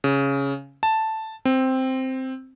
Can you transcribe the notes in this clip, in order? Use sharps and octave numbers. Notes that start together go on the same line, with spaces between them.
C#3
A5
C4